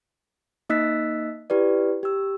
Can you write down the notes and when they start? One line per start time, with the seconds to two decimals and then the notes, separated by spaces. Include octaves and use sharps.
0.69 A#3 D#4 D#5 E6 F#6 B6
1.50 E4 G4 B4 D5
2.03 G4 E6